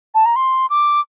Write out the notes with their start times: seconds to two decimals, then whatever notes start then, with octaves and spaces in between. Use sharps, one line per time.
0.15 A5
0.25 A#5
0.36 C6
0.70 D6